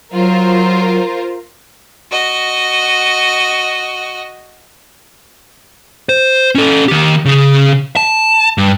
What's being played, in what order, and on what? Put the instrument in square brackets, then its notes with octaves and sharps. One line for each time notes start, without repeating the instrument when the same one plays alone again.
[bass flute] F#3 [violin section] F4 A#4 C5
[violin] F#4 D#5
[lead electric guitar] C5
C#4 A4
D#3 G4
C#3 G#4
A5
G2